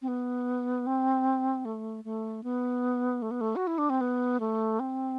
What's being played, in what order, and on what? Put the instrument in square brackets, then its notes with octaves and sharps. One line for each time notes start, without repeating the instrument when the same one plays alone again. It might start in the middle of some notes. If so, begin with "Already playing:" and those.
[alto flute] C4
B3
C4
A3
A3
B3
A3
B3
A3
F#4
E4
D4
C4
B3
A3
C4